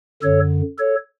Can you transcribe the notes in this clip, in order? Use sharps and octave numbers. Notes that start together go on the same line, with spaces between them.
F#2 D3 A4 C#5
A4 C#5